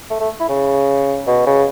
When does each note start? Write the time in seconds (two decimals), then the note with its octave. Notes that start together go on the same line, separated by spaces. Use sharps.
0.10 A3
0.20 A3
0.40 E4
0.49 C#3
1.27 B2
1.46 C#3